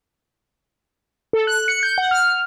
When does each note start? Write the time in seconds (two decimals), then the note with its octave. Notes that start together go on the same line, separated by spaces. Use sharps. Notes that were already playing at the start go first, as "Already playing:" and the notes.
1.33 A4
1.47 F#6
1.68 C#7
1.83 G6
1.98 F#5
2.11 F6